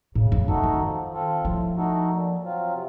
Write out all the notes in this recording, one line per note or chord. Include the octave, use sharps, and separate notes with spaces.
A2 C#3
F2
F#2 A3 D#4 F#4 A4
D#3
F3
C4 F4 A4
A2 F3
A3 D#4 F#4 A4
A#2
F#3 C4 F4
C3